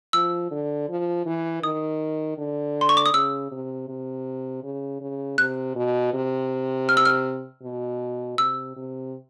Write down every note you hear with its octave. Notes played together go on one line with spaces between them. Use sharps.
F3 E6
D3
F3
E3
D#3 D#6
D3
C6
C#6
D6
D#6
C#3 E6
C3
C3
C#3
C#3
C3 F#6
B2
C3
F6
E6
F6
B2
C3 E6
C3